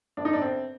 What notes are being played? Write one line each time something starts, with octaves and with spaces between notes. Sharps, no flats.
G1 D4
D#4
G1 D4
C4